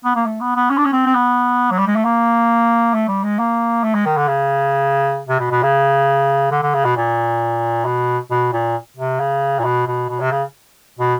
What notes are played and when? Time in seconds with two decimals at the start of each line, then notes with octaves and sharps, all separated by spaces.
0.05 B3
0.16 A#3
0.26 A3
0.40 B3
0.56 B3
0.70 C#4
0.77 D4
0.85 C#4
0.92 C4
1.06 C4
1.15 B3
1.71 F#3
1.78 G3
1.87 G#3
1.96 A3
2.04 A#3
2.94 A3
3.08 G3
3.23 G#3
3.39 A#3
3.83 A3
3.95 G#3
4.06 D#3
4.17 D3
4.28 C#3
5.29 C3
5.40 B2
5.51 B2
5.63 C#3
6.51 D3
6.62 D3
6.74 C#3
6.85 B2
6.97 A#2
7.85 B2
8.31 B2
8.53 A#2
8.97 C3
9.20 C#3
9.59 A#2
9.64 B2
9.87 B2
10.09 B2
10.20 C3
10.32 C#3
10.99 B2